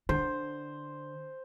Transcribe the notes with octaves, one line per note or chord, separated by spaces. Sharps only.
D3 C5